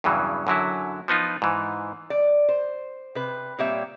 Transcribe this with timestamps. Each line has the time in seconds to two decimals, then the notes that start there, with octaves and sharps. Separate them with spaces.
0.04 E2 G2 C#3 E3 F#3
0.47 F#2 D3 F#3 E4
1.08 F3 B3 D#4 F4
1.42 G#2 E3
2.10 D5
2.49 C5
3.15 C3 B4
3.58 A#2 G3 A#3 C4 C#5 E5